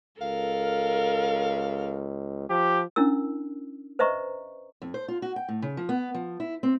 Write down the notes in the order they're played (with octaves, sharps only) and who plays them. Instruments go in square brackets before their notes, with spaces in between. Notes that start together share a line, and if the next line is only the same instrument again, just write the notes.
[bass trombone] C#2 [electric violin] A4 A#4 [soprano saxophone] F5
[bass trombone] F3 [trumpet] G4
[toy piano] C#4 D4 E4 A#4 E6
B4 C5 D#5 E5 A#5 C#6
[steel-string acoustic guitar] F2
C5
F4
F#4
G5
A2
C#3
F3
B3
F3
E4
C4